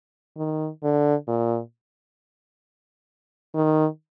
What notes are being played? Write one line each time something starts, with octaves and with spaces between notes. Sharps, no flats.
D#3
D3
A#2
D#3